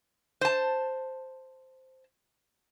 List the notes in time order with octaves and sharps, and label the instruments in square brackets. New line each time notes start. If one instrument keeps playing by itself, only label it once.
[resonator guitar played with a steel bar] C5 A5